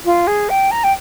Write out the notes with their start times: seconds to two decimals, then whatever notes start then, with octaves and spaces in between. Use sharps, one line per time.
0.05 F4
0.27 G#4
0.49 G5
0.71 A#5
0.83 G5